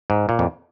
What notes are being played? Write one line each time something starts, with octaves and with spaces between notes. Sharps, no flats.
G#2
A#2
F2